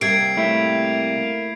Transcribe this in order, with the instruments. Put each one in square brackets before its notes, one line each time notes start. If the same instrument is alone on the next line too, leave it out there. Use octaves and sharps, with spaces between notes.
[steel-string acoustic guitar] C3 G3 [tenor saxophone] A#3 [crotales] G#6 C7 D7
[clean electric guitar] A3 E4